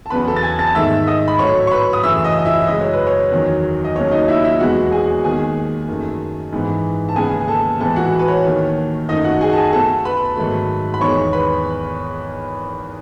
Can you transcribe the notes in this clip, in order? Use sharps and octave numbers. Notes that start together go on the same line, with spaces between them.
A5
E2 C#3 F#3 B3 B4 B5
A4 A5
A6
G#5 G#6
A5 A6
G#2 D#3 A3 E5 E6
D#5 D#6
B5
A2 F#3 A3 C#5 C#6
C#6
B4 B5
D#6
F#2 C#3 E3 A3 E5 E6
D#5 D#6
D#5
E4 E5
F#2 C#3 G#3 D#5
C#5
B4
C#5
E2 D#3 F#3
D#5
D#2 C#3 F#3 A3 C#5
D#4 D#5
E4 E5
E4 E5
E2 B2 G#3 B3 F#4 F#5
G#4 G#5
D#2 D#3 G#3 G#4 G#5
F#2 D#3 A3
G#2 E3 B3
A5
D#2 C#3 G#3 B3 G#4 G#5
A4 A5
A2 E3 G#3 B3 A4 A5
F#4 F#5
B4
C#5
D#2 D#3 A3
F#2 D#3 A3 D#4 D#5
F#4 F#5
G#4 G#5
A5
G#4 G#5
B2 A3 A4 A5
B4 B5
G#2 D#3 F#3 A3
B5
E2 D#3 G#3 B3 C#5 C#6
B4 B5